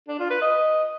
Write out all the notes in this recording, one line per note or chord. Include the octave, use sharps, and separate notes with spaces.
D4
F4
B4
D#5